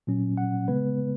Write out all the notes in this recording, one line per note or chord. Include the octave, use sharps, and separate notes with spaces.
A#2 F#3 C#4
F#5
C#3 G#3 B3 B4